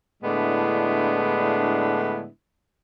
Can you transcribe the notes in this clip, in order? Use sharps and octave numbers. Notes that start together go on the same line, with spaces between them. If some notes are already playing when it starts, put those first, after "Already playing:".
A2 D3 G#3 B3 D4 E4